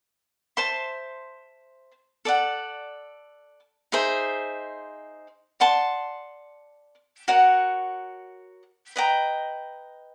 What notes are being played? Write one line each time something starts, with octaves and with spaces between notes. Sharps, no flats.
C5 E5 A5 C6
A4 D5 F#5
D#4 G#4 C5 E5
D5 F#5 A5 C6
F#4 A#4 C#5 F#5
B4 D#5 G5 A#5